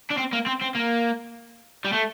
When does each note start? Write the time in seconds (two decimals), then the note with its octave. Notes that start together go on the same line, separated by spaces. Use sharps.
0.10 D4
0.17 C4
0.33 A#3
0.46 C4
0.62 C4
0.76 A#3
1.85 G3
1.93 A3